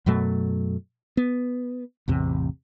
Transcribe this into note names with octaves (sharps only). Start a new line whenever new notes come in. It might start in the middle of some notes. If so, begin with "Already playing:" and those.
F#2 B2 F#3 A3
B3
A1 E2 C3